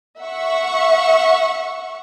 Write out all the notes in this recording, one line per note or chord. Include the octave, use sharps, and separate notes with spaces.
E5 F#5 C#6